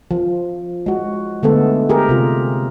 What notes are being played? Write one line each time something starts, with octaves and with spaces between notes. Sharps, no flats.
F3
G#3 F#4
D3 G#3 A3 B3 A4
G4 G#4 A#4
C3 F4